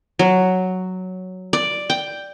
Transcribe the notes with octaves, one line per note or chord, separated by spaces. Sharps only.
F#3
D5
G5